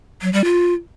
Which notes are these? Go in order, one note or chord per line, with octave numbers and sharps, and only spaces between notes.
F#3
G3
F4